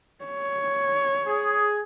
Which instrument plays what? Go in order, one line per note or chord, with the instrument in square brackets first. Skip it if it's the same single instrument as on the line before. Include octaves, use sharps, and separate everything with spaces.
[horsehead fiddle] C#5
[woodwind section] G#4